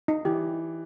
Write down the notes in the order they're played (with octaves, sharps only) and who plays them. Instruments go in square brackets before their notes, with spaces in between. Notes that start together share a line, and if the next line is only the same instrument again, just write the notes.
[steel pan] D#4
[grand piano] E3 [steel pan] G4